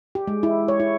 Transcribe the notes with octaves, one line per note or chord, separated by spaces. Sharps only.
G4
G#3
E4
C#5
E4